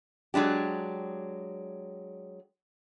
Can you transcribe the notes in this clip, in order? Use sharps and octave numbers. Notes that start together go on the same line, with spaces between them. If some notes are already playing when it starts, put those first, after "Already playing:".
F#3 G#3 D4 G4